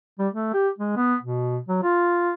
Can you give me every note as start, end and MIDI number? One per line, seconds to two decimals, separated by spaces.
0.19 0.28 55
0.33 0.52 57
0.53 0.68 67
0.78 0.92 56
0.97 1.16 59
1.22 1.59 47
1.69 1.79 54
1.83 2.34 65